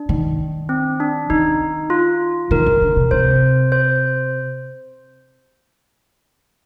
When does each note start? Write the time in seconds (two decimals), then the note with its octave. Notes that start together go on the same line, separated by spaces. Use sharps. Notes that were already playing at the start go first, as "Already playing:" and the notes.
Already playing: D4
0.09 D#3
0.69 C4
1.00 D4
1.30 D#3 D#4
1.90 F4
2.51 D#3 A#4
2.66 D#3
2.82 D3
2.97 C3
3.11 C3 C5
3.72 C5